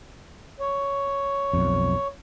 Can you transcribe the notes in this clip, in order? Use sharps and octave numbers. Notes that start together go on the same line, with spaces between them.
C#5
B1 F2